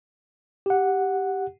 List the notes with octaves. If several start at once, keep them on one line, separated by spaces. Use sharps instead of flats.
G4 F#5